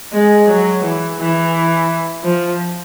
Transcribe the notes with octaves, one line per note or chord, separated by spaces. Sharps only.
G#3
F#3
E3
E3
F3